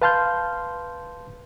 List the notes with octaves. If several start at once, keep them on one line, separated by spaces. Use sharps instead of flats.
B4 F5 A5 C6 F6 G6